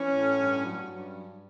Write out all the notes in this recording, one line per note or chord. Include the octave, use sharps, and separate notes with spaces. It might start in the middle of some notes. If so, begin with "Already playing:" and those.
Already playing: E3 C#4
A2
G2
F#3
G2